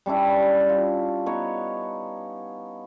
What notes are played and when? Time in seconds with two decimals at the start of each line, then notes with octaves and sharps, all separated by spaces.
0.06 G3 C#4 D4 E4
0.69 F4
1.26 B3 D#4 C#5